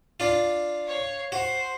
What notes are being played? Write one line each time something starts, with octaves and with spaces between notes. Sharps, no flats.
D4 F4
C#5 F5
F#4 C5